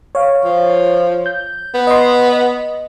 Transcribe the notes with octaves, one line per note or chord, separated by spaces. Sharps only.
C#5 F5
F3
G6
B3
D#5 C6
D#5